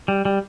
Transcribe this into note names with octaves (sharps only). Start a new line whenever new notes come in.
G3
G3